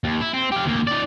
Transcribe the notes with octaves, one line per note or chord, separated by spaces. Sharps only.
D#2
E4
C4
G4 F5
D2 A#3
D#4 D5